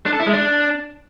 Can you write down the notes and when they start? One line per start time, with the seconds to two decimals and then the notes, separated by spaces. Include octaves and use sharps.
0.06 D4
0.13 A4
0.20 E4
0.27 G#3
0.33 D4